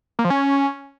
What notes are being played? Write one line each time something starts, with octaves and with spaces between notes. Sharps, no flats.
A#3
F3
C#4